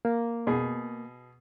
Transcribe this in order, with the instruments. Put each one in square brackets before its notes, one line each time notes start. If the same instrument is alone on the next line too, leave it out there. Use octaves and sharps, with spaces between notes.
[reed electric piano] A#3
[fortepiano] B2 G#4